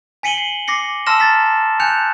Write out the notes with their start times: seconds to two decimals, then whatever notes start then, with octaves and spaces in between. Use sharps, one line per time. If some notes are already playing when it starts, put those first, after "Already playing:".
0.23 G#5 B6 C#7 D#7 F#7 G7
0.38 C7
0.68 D6 A#6 C7 C#7
1.06 A5 C6 E6 F6 A#6 E7
1.20 A#5 A6 B6
1.80 G#5 F#6 G6 C#7 F7